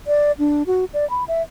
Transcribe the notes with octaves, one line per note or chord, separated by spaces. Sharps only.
D5
D4
F#4
D5
B5
E5